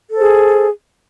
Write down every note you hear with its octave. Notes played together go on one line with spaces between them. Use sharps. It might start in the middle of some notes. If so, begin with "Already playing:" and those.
G#4 A4 C5